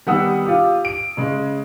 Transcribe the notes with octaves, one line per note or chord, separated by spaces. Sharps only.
D#3 G3 B3 F#5 D#6 E6
F4 G4
D7
C#3 G#3